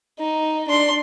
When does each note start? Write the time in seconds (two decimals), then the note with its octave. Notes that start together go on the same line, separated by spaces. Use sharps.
0.19 D#4
0.68 D4 C6